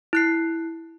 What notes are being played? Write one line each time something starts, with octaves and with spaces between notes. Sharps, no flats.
E4 F#6 C7